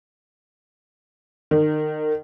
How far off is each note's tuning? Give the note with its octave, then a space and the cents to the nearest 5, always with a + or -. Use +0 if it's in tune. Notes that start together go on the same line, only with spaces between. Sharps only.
D#3 -30